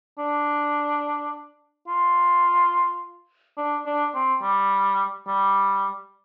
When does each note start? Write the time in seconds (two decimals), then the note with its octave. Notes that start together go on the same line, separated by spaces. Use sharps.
0.18 D4
1.88 F4
3.57 D4
3.86 D4
4.15 C4
4.42 G3
5.27 G3